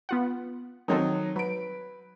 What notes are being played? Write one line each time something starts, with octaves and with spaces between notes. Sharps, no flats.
B3 F4 F#5
D#3 F#3 C4 D#4 A4
F#3 B4 D7